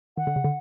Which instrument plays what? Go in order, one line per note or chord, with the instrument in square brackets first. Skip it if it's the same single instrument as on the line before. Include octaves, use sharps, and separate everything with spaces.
[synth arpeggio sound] D#3 [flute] F#5
[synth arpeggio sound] D3
C#3
D3